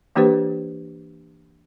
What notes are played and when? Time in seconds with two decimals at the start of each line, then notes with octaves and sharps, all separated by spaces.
0.16 E3 A#3 D4 G4 B4 C5